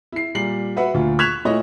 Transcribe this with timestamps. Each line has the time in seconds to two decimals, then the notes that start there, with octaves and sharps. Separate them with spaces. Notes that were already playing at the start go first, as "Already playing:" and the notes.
0.12 E4 C7
0.35 A#2 G3 C7 F#7
0.76 F#4 B4 E5 F#5
0.94 D2 A#2 F4
1.19 C#6 F#6 G#6 B6 E7 F7
1.45 A#2 A3 E4 C#5 D#5